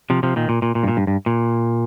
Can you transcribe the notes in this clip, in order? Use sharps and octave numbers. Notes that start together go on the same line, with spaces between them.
C3 F3
C3 F3
A#2 D#3
A#2
A#2
A#2
G2
A#2
G2
G2
A#2